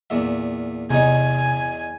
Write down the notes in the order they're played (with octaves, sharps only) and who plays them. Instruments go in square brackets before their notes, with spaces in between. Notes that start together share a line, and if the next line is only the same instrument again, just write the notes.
[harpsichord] E2 A#2 E5
[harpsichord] E2 D#4 C#5 [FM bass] C3 [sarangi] G#5